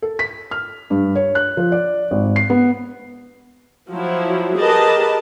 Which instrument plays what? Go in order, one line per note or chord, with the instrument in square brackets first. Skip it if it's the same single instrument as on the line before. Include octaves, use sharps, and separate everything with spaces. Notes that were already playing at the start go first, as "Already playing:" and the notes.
[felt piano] A4
B6
F6
G2
C#5
F#6
F3
D5
G#1
C7
B3
[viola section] F3 F#3 E4
G4 G#4 A#4 B4 D#5 A5